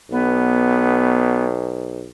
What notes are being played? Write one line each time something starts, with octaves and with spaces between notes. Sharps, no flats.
B1 B3